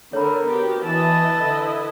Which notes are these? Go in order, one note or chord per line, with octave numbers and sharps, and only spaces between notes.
D3 A#4 C#5 B5
B3 F#4 G4
E3 E4 B4 D#5 A5
D3